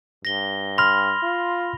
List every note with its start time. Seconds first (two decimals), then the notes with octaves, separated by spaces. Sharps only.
0.25 G2 A#6 G7
0.78 B5 C6 F6 A#6 F7
1.23 F4